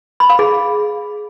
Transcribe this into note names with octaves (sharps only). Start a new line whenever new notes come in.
B5
F5
G#4